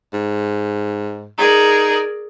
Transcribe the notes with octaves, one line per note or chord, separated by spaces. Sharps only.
G#2
D#4 G#4 A#4 D5